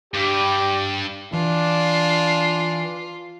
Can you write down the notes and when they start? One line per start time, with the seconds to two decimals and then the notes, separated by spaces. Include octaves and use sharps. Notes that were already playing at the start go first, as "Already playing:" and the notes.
0.14 G2 G4
1.33 E3 D4 F4